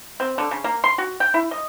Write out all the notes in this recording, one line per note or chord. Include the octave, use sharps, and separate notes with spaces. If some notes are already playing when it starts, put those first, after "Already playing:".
C4
D3
C#3
A#3
C6
F#4
G5
E4
D#5